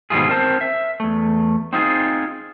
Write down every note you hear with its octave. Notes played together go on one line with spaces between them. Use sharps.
G#2 B2 D#3 G3 F4 G#4
C4 A#4 C5 A5
E5
E2 A3
C4 D#4 F4 G#4